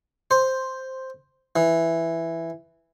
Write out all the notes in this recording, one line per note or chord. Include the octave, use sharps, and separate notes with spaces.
C5
E3